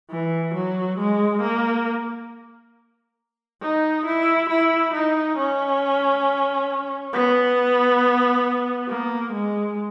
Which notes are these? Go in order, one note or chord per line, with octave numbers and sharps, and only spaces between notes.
E3
F#3
G#3
A#3
D#4
E4
E4
D#4
C#4
B3
A#3
G#3